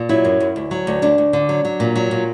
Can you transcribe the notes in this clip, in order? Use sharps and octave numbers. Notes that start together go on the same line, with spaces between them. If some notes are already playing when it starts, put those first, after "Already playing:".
Already playing: A#2
F#3 E4
F#2
F#2
D2
F#3
D2
D2 D4
D2
D3
F#3
F#3
A#2
F#3
A#2